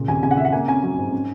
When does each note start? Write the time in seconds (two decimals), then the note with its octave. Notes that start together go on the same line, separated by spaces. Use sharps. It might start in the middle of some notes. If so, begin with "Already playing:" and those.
Already playing: A#2 C#3
0.08 D#2 G#5
0.23 C#3 G#5
0.31 F#5
0.37 C#3 E5
0.45 F#5
0.52 A#3 G#5
0.68 C#4 G#5
0.83 F#3
0.97 G#2
1.12 C#4